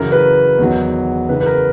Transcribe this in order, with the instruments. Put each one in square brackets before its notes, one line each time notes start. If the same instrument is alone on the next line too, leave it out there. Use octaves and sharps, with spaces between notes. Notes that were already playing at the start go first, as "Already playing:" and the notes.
Already playing: [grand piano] F#2 C#3 E3 A#4
B4
E2 D#3 F#3
F#2 C#3 E3 B4
B4
A#4